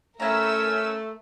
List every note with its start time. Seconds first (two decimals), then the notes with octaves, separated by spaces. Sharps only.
0.20 A3 C#4 E4 A#4 E5 A#5 E6